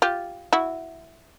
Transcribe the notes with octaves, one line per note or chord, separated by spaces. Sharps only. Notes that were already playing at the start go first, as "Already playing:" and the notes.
F4 G4
E4 F#4